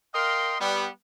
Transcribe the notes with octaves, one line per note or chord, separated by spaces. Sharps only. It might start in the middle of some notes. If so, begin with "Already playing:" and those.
A#4 D#5 F5 G5 C6
G3 B3